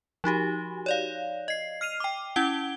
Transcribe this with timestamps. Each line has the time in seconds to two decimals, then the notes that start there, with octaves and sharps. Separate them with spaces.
0.24 F3 D#4 F#4 G4
0.86 C#5 D5 F5
1.48 D#5 C7
1.81 F6 C7 D#7 F7
2.00 G5 D6
2.36 C#4 E4 F#5 G#6 D7 G7